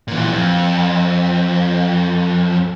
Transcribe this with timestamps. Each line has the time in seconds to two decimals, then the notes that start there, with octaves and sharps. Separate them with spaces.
0.08 A#2 E3
0.32 F2